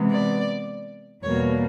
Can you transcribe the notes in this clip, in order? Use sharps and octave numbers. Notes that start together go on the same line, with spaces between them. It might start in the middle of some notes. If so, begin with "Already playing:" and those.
Already playing: C3 E3 G#3 B3
D5
E2 B2 G3 A#3 C#5